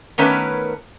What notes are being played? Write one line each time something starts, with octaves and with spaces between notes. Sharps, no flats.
D#3 A3 B3 C#4 A#4 B4